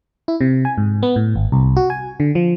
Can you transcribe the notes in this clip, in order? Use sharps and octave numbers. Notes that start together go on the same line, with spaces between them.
E4
C3
G#5
G#2
B3
A2
G#1
C2
F#4
G#5
D3
F3